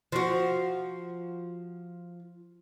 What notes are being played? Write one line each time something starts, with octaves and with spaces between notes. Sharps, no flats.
F3 F#4